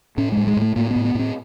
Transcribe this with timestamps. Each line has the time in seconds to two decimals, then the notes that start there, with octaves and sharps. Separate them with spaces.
0.18 A2 C#4
0.32 A2 G#3
0.47 G#3
0.57 A2
0.62 A3
0.76 A2 A#3
0.90 B3
0.96 A2
1.05 B3
1.15 A2 C4